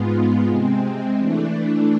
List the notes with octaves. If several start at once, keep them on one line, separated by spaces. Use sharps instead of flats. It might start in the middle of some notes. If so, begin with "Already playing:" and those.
Already playing: G#2 G#3 B3 F4
C3 G#3 C4
E3 A3 D4